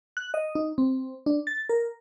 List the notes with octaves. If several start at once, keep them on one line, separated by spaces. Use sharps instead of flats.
F#6
D#5
D#4
C4
D4
A6
A#4